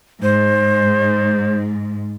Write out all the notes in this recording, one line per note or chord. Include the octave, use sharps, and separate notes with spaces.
G#2 C5